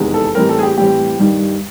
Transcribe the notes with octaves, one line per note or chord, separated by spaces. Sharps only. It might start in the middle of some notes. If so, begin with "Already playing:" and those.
Already playing: F1 E2 C3 D#3 G#3
A4
A2 E3 G3 C4 A#4
A4
G#4
G4
A2 E3 G3 C4 G4
G2 D#3 G3